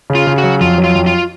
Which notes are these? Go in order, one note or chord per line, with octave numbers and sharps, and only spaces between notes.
C#3
F4
C#3
F#4
F#3
F2 F4
F#3
F4
F2
F4